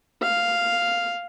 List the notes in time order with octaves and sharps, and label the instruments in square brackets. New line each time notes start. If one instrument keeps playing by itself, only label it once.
[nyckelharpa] F5